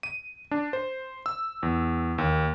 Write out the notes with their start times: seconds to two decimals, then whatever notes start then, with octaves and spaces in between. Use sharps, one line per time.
0.03 D#7
0.51 D4
0.73 C5
1.26 E6
1.63 E2
2.18 D#2